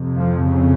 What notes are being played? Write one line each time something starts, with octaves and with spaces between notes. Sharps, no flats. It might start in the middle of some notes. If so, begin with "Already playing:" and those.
Already playing: F2 C3
F3
C#3